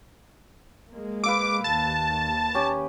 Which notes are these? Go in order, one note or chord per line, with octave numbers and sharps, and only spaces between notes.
G#3 A#3
B4 F5 D6 E6
D#2 A5
C#4 G4